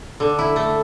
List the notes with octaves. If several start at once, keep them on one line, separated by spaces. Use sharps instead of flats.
D3
E4
A3